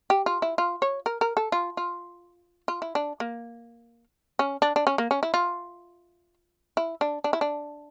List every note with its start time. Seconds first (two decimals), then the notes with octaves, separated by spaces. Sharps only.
0.10 G4
0.26 F4
0.42 E4
0.58 F4
0.82 C#5
1.06 A#4
1.21 A#4
1.37 A4
1.52 F4
1.77 F4
2.68 F4
2.82 E4
2.95 D4
3.20 A#3
4.39 C#4
4.62 D4
4.76 D4
4.87 C#4
4.98 A#3
5.11 C#4
5.23 E4
5.34 F4
6.77 E4
7.01 D4
7.24 D4
7.33 E4
7.41 D4